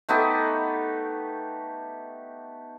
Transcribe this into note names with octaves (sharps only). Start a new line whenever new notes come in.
A3 B3 D#4 G4